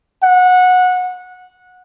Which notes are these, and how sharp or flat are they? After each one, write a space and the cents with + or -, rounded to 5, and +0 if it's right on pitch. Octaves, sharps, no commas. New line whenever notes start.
F#5 -20